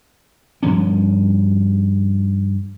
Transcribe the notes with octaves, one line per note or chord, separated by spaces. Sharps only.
G2 F3 C#4